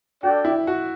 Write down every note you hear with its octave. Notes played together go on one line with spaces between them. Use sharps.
D4 F#4 A4 D5 G5
E4
F#4